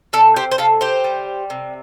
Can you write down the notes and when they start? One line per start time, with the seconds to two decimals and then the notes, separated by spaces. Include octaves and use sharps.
0.13 C3 A4 D5
0.36 G4 C5
0.52 C5
0.58 C3 F4 A4
0.81 G4 C5
1.04 G3
1.50 C3